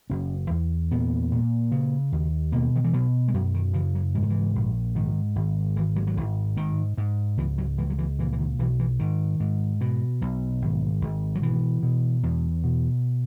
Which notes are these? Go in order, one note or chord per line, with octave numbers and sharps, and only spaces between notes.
F#1 C#4
E2
A#2 B3
A#2
C#3
D#2
B2 A#3
D#3
E3
B2 F#3
G#3
F#2 F#3
D#3
C#3 E3
F#3
G#2 E3
D#3
E3
A#1
G#2 D#3
G#1
G#1 E3
F#3
F#3
G#1 E3
G#2 D#3
G#2
C#2 E3
F#3
C#2 E3
F#3
E3
A#2 E3
E3
D#3
B1 E3
E3
G#2 D#3
G#2
B2
B1
G#1
G#1
F#3
B2 E3
B2
E2
B2